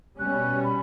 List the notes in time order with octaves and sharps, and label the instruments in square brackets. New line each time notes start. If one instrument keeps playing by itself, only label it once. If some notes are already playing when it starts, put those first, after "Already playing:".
[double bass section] B2 G3 C#4 [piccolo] F#6
[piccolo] B5